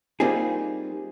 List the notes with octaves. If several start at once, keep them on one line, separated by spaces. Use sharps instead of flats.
G3 A#3 C4 D#4 F4 G#4